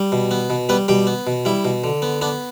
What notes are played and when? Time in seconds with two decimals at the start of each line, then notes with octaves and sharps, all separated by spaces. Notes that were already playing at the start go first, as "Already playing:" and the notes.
Already playing: G3
0.12 B2
0.31 B3
0.50 B2
0.69 G3 B3 B4
0.88 B2 G3 G4
1.07 B3
1.27 B2
1.45 G3 E4
1.65 B2
1.84 D3
2.02 B3
2.21 B3 D4